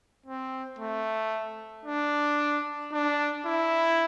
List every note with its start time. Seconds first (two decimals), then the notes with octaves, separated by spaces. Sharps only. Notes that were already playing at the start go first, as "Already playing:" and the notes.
0.26 C4
0.79 A3
1.86 D4
2.93 D4
3.46 E4